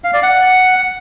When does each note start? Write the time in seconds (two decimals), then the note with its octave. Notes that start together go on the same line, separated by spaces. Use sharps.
0.04 F5
0.14 D5
0.23 F#5